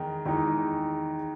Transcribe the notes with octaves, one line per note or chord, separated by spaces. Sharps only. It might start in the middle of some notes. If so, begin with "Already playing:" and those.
Already playing: E2 D#3 G#3 D#4
E2 D#3 G#3 D#4